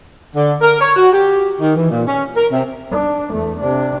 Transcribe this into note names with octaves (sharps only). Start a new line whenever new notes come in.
D3
A#4
C#5
F#4
G4
D#3
E3
A#2
C#4
A#4
C3
D4
E2 A3
C3 D4